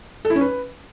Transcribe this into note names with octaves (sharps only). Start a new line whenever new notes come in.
A4
E4
C#4
B4